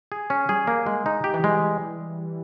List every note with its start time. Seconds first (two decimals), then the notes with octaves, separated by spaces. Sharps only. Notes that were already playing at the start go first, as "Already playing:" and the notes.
0.12 G#4
0.30 C#4
0.49 G3 G#4
0.67 A#3
0.86 G#3
1.06 D#4
1.24 G4
1.34 E3
1.44 G3 G#3